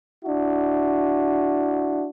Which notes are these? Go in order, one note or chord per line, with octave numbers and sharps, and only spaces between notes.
D4 E4 F#4